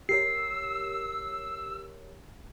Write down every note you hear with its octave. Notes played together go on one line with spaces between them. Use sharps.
G4 A#4 C#5 E6 C7